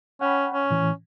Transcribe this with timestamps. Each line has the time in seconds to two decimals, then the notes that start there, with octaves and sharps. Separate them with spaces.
0.21 C#4 F#5 G5 B5
0.54 C#4
0.70 A2 E3